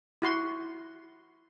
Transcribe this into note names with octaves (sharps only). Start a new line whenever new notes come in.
E4 F#4 C6